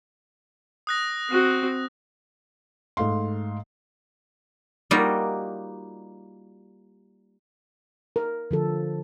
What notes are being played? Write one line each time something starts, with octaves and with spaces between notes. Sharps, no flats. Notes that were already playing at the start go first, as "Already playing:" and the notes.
D#6 F#6 A#6
C4 F#4
G#2 A3 F5 C6
G3 A#3 D#4 F4 F#4
A#4
D3 F3 A4